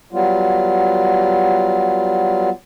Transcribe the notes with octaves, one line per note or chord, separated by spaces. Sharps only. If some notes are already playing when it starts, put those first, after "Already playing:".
F#3 G3 B3 F4